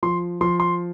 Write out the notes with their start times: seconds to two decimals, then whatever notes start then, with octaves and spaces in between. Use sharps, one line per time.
0.03 F3 C6
0.41 F3 C6
0.60 C6